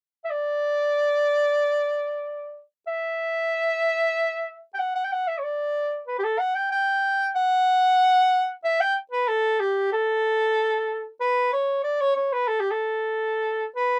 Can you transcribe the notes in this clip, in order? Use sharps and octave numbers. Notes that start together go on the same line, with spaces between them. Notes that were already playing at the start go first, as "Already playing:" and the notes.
E5
D5
E5
G5
F#5
F#5
G5
F#5
E5
C#5
D5
B4
G4
A4
F#5
G5
G5
F#5
E5
G5
B4
A4
G4
A4
B4
C#5
D5
C#5
C#5
B4
A4
G4
A4
B4